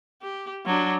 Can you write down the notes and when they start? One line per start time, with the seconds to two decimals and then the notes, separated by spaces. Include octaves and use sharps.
0.22 G4
0.66 F#3 D4